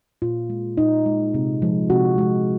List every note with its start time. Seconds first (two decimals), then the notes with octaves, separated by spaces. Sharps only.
0.22 A#2 F4
0.50 G#3
0.77 A#2 D#4
1.06 G#3
1.34 C3
1.62 F3 G#3
1.90 C3 F#4
2.18 F3 G#3